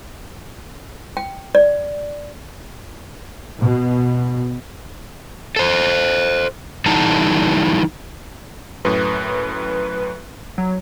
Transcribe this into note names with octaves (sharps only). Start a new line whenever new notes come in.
G5
D5
B2
A4 C5
E3 G3 D#4 A4 A5 A#5
F#2 A2 B4
F#3